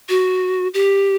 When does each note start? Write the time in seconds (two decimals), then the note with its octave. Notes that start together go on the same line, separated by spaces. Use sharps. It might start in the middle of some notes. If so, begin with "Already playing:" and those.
0.09 F#4
0.74 G4